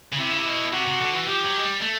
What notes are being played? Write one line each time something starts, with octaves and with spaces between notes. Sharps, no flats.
C#3
C3 E4
C#3
C3
B2
C3 F#4
C3
D3
E3
F3 G4
F#3
G#3
G3
A3